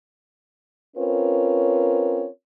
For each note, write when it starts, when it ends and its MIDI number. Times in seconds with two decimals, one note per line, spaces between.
0.97 2.27 60
0.97 2.27 61
0.97 2.27 65
0.97 2.27 70
0.97 2.27 71
0.97 2.27 73